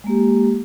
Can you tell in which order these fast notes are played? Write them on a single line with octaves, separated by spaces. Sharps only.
G#3 A#3 G4